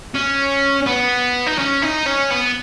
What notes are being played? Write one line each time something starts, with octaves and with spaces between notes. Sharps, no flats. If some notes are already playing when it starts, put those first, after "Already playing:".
C#4
B3
D#4
C#4
D#4
C#4
B3